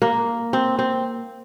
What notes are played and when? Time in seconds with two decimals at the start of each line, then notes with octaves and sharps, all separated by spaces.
0.02 A#3
0.53 C4
0.79 C4